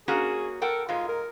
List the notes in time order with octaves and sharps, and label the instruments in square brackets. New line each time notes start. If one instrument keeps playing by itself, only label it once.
[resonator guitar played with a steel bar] A#3 C#4 F#4 [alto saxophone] G#4
[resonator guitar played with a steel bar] A4 F#5 G5 [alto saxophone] A#4
[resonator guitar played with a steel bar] G#2 G#3 [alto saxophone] F4
[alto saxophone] A#4